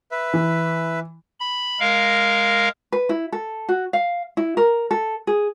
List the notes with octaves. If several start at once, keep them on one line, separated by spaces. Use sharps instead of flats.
B4 E5
E3
B5
G#3 A#4 F5
B4
E4
A4
F#4
F5
E4
A#4
A4
G#4